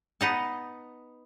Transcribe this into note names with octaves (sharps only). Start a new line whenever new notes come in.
B3 D#4 A5